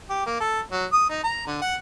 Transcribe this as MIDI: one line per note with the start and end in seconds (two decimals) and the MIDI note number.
0.10 0.25 67
0.26 0.36 58
0.40 0.60 69
0.72 0.85 54
0.92 1.07 87
1.10 1.19 63
1.24 1.46 82
1.47 1.61 50
1.61 1.76 78